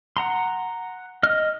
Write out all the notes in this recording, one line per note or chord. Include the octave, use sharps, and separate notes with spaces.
F#5 A#5 C6
D#5 F6